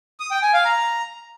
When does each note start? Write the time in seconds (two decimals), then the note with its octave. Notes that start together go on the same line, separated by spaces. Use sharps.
0.20 D#6
0.31 G5
0.42 G#5
0.54 F5
0.65 A#5